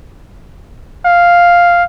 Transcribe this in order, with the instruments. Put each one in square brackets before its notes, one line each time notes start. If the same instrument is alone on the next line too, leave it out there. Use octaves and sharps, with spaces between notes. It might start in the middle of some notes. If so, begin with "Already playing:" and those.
[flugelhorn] F5